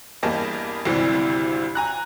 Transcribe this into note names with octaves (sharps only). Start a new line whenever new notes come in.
E2 G2 A#3 G#4 D#5 A5
G#1 D2 G2 C3 E3 G3
G#5 A#5 F#6